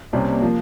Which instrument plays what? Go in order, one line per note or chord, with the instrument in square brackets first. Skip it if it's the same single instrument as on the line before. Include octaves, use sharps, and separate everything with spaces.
[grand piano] C2 C3 G3 C#4 [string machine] A#3
[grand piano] F3